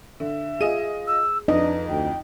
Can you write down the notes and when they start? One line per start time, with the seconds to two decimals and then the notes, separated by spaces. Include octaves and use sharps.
0.20 D3 E5
0.61 F4 G#4 D#5 D#7
1.07 E6
1.48 F2 D4 D#4 B4 D#5
1.89 D2 G5